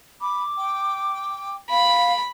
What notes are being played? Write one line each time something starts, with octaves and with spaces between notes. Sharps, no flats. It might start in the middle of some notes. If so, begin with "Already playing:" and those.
B5 D6
G5
F5 B5